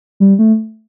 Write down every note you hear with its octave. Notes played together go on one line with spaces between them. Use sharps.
G3
A3